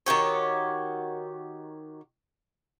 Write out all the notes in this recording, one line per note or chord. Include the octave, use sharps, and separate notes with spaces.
D#3 F#4 G4 C#5